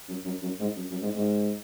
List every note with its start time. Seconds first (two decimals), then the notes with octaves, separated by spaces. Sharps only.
0.08 F#2
0.25 F#2
0.42 F#2
0.60 G#2
0.76 F#2
0.90 F#2
1.01 G#2
1.15 G#2